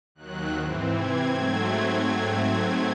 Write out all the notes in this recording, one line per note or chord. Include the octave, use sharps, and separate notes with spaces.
D#2 D#3 F#3 F#6
G#2 E3 C4
C3 E3 C4 G#6
G#2 F#3 A3 C4 G#6